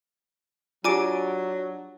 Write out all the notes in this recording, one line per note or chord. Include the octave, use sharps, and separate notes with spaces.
F#3 D4 F4 G4 D5 G#5 D6 D7